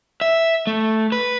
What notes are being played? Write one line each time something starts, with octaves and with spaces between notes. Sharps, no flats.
E5
A3
B4